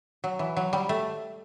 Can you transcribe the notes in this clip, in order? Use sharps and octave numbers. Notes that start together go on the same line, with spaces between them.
F#3
E3
F#3
G3
A3